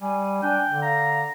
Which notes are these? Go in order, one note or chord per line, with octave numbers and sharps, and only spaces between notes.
G3 G#5
D4 G5
D3
F5 A#5